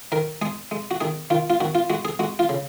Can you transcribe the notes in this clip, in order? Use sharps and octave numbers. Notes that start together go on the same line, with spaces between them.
D#3 A#4
G#3 G#4
G#3
F#4
D#3 G#4
D#3 F4
F4
D#3 F#4
F4
G#3 F#4
G#4
G#3 F#4
F4
C#3